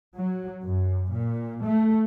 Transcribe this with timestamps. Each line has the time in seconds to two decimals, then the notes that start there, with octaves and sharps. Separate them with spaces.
0.17 F#3
0.64 F#2
1.11 A#2
1.63 A3